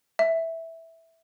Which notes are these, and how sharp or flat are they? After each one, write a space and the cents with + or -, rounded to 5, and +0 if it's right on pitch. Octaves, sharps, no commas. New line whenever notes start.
E5 -5